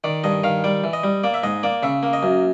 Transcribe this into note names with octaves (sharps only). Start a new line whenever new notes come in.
D#3 D5
G2 D#5
D#3 F5
G3 D5
E3
D#5
G3
A#3 D5
E5
G#2 D#5
A#3 D5
C#3 E5
A#3
D#5
F#2